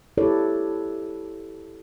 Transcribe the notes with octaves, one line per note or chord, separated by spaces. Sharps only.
E4 G4 A4 B4 C#5 D5